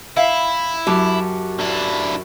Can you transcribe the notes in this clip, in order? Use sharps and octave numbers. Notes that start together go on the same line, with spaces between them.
E4 E5 F5
F#2 G4 A5
D3 E4